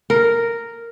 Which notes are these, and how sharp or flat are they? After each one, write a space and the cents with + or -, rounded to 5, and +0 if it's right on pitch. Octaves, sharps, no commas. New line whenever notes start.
A#4 -5